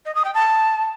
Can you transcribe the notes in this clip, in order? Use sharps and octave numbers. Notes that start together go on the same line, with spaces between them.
D#5
D#6
G5
A5